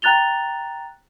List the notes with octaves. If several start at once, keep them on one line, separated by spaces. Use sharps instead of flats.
G5 A#5 F#6 A6 F7 G7